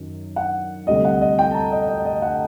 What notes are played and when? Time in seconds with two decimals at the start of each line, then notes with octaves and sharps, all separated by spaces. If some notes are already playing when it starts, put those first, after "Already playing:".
Already playing: F#2 D#3
0.36 F#5
0.87 D2 C3 G3 D#5
1.05 F#5
1.21 D#5
1.39 G5
1.51 A5
1.54 A#5
1.72 D#5
1.88 D#5
2.05 D#5
2.22 F#5